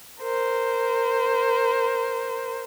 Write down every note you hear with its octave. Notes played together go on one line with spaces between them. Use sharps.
A#4 C5